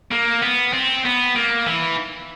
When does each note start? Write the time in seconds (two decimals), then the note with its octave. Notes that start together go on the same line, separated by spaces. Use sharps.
0.11 A#3
0.42 B3
0.73 C4
1.05 B3
1.36 A#3
1.67 E3